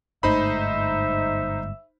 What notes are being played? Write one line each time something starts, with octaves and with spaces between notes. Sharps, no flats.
G1 G#2 A3 D#4 C5 E5 B5